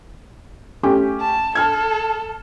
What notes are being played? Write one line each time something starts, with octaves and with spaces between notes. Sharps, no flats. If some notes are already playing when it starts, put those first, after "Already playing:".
A3 C#4 G4
A5
A4 A5 F6 G#6